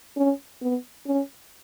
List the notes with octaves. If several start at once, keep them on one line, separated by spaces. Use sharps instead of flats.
C#4
B3
C#4